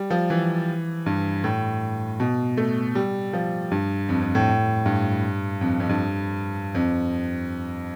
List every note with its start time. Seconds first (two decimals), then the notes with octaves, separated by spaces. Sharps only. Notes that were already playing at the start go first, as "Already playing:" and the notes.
Already playing: G3
0.10 F3
0.30 E3
1.06 G2
1.44 A2
2.20 B2
2.57 A3
2.95 G3
3.33 F3
3.71 G2
4.09 F2
4.21 F2
4.35 A2
4.86 G2
5.61 F2
5.80 F2
5.89 G2
6.75 F2